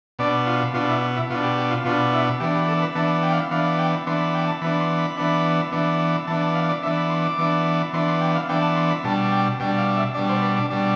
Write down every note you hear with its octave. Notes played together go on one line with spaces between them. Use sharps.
B2 B3 D4 D5
F4
B2 B3 D4 F4
E4
D4
E4
B2 B3 D4 F4
G4
G4
F4
B2 B3 D4 F4
E4
E3 B3 D4 G4
G4
A4
B4
E3 B3 D4 A5
G5
F5
E3 B3 D4 F5
G5
E3 B3 D4 C6
B5
G5
A5
E3 B3 D4 B5
C6
B5
E3 B3 D4
E3 B3 D4
E3 B3 D4 A5
A5
F5
D5
E3 B3 D4 E5
B5
C6
D6
E3 B3 D4
E3 B3 D4 C6
C6
G5
F5
E3 B3 D4 G5
A5
C6
B5
B2 G3 D4 A5
G5
B2 G3 D4 G5
F5
E5
B2 G3 D4 D5
C5
B4
D4
B2 G3 D4